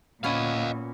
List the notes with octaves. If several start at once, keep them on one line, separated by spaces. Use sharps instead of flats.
A#2 B3 C#4 E4 D#5 F5